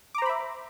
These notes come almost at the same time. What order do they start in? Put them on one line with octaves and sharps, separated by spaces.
D6 A#5 C5 B5 E5